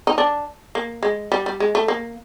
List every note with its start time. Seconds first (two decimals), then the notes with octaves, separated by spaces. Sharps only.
0.07 D#4
0.18 D4
0.75 A#3
1.03 G#3
1.32 G3
1.46 G3
1.60 G#3
1.75 A3
1.88 A#3